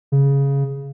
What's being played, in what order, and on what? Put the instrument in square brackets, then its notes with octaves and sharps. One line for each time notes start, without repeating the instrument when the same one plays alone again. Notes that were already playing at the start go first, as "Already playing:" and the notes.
[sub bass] C#3